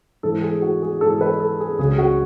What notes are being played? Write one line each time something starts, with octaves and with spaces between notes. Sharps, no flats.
G#2 E3 A4
G#4
F#4
G#4
G#2 E3 A4
B4
A4
G#4
C#2 C#3 F#3 G#4
F#4